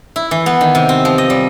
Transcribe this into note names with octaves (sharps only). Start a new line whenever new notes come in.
E4
E3
B3
D#3
C3
C4
F3
D#5
G3